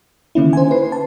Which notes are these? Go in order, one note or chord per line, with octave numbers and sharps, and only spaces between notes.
D3 D#3 A#3 C#4 E4
C5 G#5
B4 C7
A5